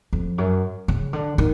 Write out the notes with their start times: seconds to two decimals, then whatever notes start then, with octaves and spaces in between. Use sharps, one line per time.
0.13 F2
0.38 F#2
0.88 C#3
1.13 D3
1.38 D#3